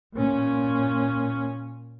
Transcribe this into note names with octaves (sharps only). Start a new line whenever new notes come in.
A#2 C#4